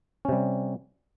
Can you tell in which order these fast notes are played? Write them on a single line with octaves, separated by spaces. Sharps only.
C#4 C3 G3